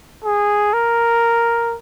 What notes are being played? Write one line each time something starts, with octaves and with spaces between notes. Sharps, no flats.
G#4
A#4